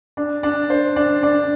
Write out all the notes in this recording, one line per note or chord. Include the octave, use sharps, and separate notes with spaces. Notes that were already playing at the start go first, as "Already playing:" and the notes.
D4
D4
C5
D4
D4